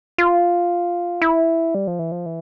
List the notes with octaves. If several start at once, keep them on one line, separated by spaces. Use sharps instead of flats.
F4
E4
G3
F3
E3
F3
E3